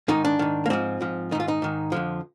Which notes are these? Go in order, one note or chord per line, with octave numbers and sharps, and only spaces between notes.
G#2 D#3 D#4
D4
G#2 D#3
A#3
G#2 F3 C4
G#2 F3
G#2 D#3 D#4 F4
D#4
G#2 D#3
F2 D3 F3